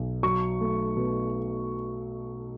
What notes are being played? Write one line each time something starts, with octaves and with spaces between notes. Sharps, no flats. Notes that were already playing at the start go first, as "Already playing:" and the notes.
Already playing: B1
F#3 C#6
A3
B2